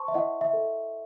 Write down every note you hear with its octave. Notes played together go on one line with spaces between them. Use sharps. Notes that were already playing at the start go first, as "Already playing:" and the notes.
Already playing: C5 A5 C6 C#6
E5
E4 D#5 F#5
E5
A4